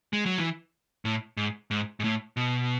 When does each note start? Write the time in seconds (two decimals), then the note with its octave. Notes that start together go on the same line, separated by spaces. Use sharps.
0.13 G#3
0.26 F#3
0.38 E3
1.05 A2
1.37 G#2
1.71 G#2
2.00 G#2
2.04 A2
2.37 B2